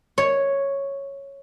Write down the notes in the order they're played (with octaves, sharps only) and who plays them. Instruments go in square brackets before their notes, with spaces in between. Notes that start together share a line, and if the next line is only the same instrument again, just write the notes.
[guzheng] C#5